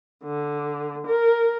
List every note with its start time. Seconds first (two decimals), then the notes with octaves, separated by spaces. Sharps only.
0.24 D3
1.06 A#4